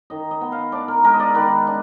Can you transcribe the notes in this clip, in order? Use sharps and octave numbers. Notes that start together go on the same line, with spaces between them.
D#3 D#5
D#5
B3
F5
D4 D5
A#4
G#3 A#4
D#5
D5
D#3 B4
D4